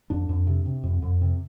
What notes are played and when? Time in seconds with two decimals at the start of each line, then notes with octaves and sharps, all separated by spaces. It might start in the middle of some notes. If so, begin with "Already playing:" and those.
0.10 F2 D4
0.29 F2
0.47 C3
0.65 C3
0.83 F2
1.02 F2
1.21 C3